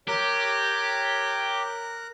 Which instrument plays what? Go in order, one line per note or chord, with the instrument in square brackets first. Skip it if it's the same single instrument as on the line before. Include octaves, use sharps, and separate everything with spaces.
[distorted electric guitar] G4 [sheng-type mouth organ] A#4 A#5 F#6 [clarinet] C#5